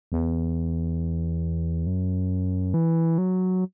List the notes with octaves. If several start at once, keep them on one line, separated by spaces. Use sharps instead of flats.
E2
F#2
E3
F#3